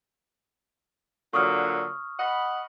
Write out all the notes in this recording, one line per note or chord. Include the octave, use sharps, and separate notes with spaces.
A#2 D3 F#3 C#6 D#6 F6
D#5 F#5 B5